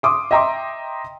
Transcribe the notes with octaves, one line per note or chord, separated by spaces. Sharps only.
C6 D6 D#6
D#5 E5 G5 A#5 C6 D6